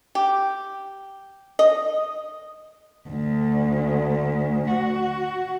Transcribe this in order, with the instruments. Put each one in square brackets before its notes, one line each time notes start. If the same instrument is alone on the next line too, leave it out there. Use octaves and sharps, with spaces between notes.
[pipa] G4
D#5
[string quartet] D2
F#4